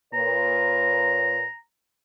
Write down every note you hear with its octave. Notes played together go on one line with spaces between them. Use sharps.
A#2 B4 C#5 A#5